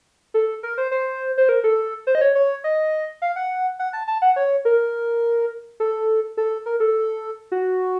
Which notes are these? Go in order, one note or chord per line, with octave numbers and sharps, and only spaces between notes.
A4
A#4
C5
C5
C5
A#4
A4
C5
D#5
C#5
C#5
D#5
F5
F#5
F#5
A5
A5
F#5
C#5
A#4
A4
A4
A#4
A4
F#4